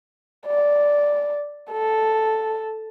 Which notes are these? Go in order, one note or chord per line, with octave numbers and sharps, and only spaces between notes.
D5
A4